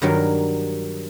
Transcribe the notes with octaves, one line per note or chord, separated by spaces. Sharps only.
G2 D#3 F#3 A#4